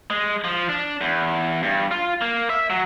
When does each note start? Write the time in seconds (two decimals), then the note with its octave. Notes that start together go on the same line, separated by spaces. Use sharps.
0.10 G#3
0.44 F3
0.69 D4
1.01 E2
1.63 G2
1.91 F4
2.21 A#3
2.50 E5
2.70 F#3